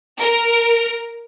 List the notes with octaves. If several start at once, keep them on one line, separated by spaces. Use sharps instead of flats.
A#4